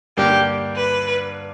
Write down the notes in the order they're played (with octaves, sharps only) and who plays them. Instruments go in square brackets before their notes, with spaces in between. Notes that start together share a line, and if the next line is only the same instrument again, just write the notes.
[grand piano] G2 D3 A#3 D4 [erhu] G4
[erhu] B4